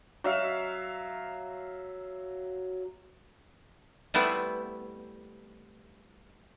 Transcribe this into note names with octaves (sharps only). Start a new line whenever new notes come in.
F#3 E5 F5
G3 A3 B3 C4 E4